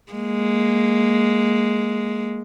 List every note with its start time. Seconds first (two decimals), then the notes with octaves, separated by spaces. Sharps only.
0.12 G#3 A#3